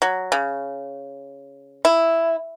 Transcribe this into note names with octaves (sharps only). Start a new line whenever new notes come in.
F#3
C#3
E4